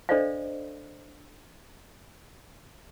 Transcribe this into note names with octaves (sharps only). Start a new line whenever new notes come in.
D4 A4 C5 D5 D#5 F5